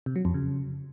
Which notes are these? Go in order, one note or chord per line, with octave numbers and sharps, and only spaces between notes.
C3
F#3
F2
C#3